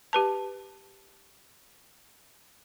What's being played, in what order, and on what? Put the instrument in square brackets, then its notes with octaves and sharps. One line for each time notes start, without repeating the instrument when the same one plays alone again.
[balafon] G4 B4 A5